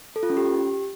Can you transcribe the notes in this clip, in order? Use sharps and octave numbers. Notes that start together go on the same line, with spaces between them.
A4
F4
C#4
G4